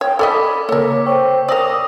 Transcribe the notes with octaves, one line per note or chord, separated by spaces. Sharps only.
C#5 G5
A4 D5 D#5 B5 D6 B6
C#3 A#3 A4 A#4 C#5
C5 C#5 G5 C#6 E6
A#4 D5 D#6 E6 A#6 F7